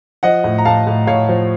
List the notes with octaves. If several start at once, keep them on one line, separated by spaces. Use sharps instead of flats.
F3 D#5 F#5
A2
A#5
A2 F5 A5
A2
A2 C#5 F5
F3